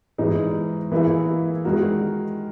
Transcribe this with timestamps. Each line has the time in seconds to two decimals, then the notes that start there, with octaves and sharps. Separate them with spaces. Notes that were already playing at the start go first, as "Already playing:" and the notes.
0.18 G#2 E3 G#3 D#4
0.92 E3 A#3 E4 G#4
1.65 D#3 G#3 D#4 F#4 A#4